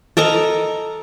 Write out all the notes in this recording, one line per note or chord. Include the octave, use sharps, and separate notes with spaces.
A4 A#4 D#5 A#5